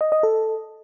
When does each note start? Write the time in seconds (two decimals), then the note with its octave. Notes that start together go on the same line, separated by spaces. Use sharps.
0.01 D#5
0.12 D#5
0.23 A4